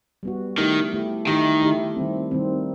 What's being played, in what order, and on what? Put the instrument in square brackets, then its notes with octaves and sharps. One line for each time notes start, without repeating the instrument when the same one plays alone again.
[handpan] G3 B3 F#4
[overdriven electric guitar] D#3 [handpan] A3 E4 G4
[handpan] A3 E4 G4
[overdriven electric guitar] D#3 [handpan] A3 E4 G4
[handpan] A3 E4 G4
D#3 G3 C4
D#3 G3 C4